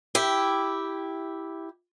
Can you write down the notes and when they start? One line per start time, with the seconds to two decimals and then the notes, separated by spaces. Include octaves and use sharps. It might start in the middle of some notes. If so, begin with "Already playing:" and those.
0.15 E4 G4